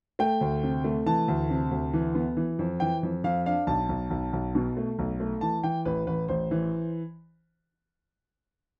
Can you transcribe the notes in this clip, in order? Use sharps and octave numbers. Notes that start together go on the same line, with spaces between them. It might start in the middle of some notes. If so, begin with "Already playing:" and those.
A3 G5
D2
C3
A3
E3 A5
D2
C3
D2
E3
B3
E3
F2
E3 G5
F2
F2 F5
D4 F5
B1 A5
B1
B1
B1
B2
A3
B1
A3
E3 A5
E3 G5
A1 B4
A1 B4
A1 C5
E3